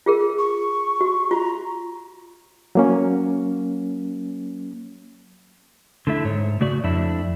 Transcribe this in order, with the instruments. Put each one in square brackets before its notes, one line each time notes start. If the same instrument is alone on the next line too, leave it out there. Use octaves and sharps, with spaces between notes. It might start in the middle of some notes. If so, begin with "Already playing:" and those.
[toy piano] F4 G#4 A#4
[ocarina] C#6
[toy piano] F#4
[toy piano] F4 F#4 [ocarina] A#5
[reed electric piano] F#3 A#3 C#4
[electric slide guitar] D3 A3 E4
G#2 C#5
C#3 A3 F#4 D5
F2 D4 E4